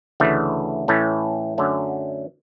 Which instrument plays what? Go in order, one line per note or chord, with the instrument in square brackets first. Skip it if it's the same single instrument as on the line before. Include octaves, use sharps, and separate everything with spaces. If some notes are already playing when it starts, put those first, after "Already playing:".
[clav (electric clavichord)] D2 C#3 E3 A3
A2 E3 A3 C#4
F#2 D3 F#3 A3 C#4